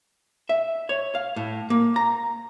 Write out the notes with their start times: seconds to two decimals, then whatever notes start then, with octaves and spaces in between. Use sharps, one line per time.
0.49 E5
0.89 C#5
1.15 F5
1.36 A2
1.70 A#3
1.96 A#5